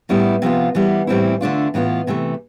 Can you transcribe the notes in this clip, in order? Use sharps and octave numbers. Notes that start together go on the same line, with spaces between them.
A2 G3 B3 E4
C3 F3 B3 F4
E3 G3 B3 E4
A2 E3 G3 C4 E4
D3 A3 D4 F4
A2 E3 B3 F4
C3 E3 A3